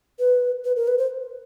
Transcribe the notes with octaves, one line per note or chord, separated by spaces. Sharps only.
B4
B4
A#4
B4
C5